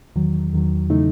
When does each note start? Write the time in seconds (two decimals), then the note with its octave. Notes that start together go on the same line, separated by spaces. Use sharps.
0.16 E2 D#3 F#3
0.53 E2 D#3 F#3
0.90 C#3 E3 A3 D#4